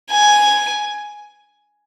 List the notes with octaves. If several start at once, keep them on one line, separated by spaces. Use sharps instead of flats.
G#5